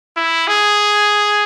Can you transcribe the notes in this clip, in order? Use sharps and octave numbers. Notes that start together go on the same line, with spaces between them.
E4
G#4